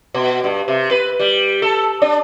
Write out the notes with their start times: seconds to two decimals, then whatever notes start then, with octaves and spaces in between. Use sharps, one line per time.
0.14 B2
0.44 G2
0.68 C3
0.91 B4
1.20 G3
1.62 A4
2.02 D4